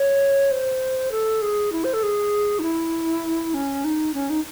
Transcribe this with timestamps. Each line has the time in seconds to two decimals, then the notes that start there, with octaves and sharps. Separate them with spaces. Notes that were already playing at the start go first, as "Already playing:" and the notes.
Already playing: C#5
0.51 C5
1.11 A4
1.42 G#4
1.72 E4
1.84 C5
1.94 A4
2.03 G#4
2.59 D#4
2.63 E4
3.54 C#4
3.84 D#4
4.14 C#4
4.30 D#4